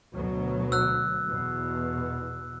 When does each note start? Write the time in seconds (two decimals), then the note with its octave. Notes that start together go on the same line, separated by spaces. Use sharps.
0.13 D2 B2 F#3
0.72 E6 F#6
1.29 E2 B2